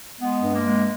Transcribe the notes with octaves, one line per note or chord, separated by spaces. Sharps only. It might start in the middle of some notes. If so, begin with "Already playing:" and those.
G#3 B3
G2
A#3
G#3